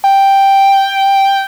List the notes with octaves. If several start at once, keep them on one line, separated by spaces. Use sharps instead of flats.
G5